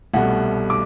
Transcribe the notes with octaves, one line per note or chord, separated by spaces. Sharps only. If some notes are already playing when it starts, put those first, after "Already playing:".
C2 B2 A3 F#5
D6